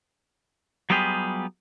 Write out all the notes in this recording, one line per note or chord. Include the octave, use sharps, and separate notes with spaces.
F#3 G3 B3 F4 G4 G#4